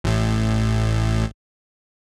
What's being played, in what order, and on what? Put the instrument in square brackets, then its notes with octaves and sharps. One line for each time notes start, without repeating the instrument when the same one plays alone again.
[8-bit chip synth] A1 A2